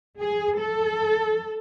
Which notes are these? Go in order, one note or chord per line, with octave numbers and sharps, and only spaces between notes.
G#4
A4